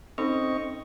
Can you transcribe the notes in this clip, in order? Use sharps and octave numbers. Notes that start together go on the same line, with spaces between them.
C4 C#4 D#4 A4 D#5 C#6